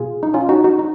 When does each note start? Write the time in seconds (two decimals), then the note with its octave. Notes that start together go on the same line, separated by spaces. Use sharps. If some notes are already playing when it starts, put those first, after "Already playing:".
Already playing: B2 F4 G#4
0.23 D#4
0.34 C#4 F4
0.49 D#4 F#4
0.64 D#4 F#4
0.79 D#4